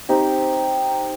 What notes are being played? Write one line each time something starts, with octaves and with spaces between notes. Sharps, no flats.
C4 D#4 G4